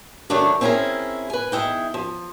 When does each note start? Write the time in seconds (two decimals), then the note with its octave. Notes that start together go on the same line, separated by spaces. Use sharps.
0.30 D#3 F#3 A3 C#4 D4 E4
0.61 C4 C#4 E4 F4 G#4 A#4
1.30 B4 G#5
1.52 E2 D#4 E4 G5
1.94 F3